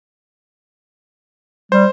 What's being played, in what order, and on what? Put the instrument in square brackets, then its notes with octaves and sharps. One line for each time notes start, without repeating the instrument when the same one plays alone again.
[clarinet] G3 [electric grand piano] C5